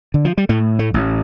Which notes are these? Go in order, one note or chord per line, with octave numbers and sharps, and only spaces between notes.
D3
F3
G3
A2 A3
A3
A1